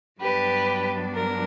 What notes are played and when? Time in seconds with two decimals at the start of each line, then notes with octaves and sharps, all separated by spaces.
0.20 G2 F#3 B3 D4 G4 B4
1.14 A#4